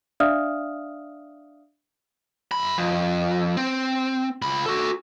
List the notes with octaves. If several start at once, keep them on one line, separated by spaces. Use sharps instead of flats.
D4 D5 E5 F5 D#6 F6
F#2 B5
F2
C4
C#2 B5
F#4 A4